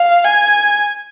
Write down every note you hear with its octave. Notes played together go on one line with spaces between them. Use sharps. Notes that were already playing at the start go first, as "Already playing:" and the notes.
Already playing: F5
G#5